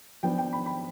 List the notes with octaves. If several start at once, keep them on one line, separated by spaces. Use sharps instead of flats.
F3 B3 D4 G5
G5
B5
B5